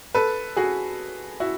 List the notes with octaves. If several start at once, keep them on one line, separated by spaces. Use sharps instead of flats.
A4 B4
F#4 G#4
E4 F#4